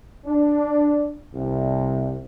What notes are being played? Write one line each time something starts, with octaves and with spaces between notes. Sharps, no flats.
D4
C2